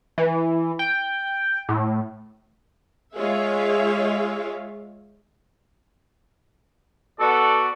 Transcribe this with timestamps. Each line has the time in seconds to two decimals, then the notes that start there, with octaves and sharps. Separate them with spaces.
0.18 E3
0.79 G5
1.69 A2
3.17 G#3 F4 G#4 C#5 E5 F5
7.20 B3 F#4 A4 D5